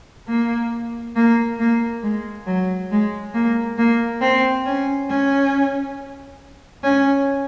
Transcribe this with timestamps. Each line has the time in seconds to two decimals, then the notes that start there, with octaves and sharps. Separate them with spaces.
0.28 A#3
1.16 A#3
1.60 A#3
2.03 G#3
2.47 F#3
2.91 G#3
3.34 A#3
3.78 A#3
4.21 C4
4.66 C#4
5.10 C#4
6.83 C#4